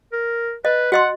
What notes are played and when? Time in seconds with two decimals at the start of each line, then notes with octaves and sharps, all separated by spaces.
0.13 A#4
0.65 B4 D#5
0.92 F#4 D#5 F#5 C6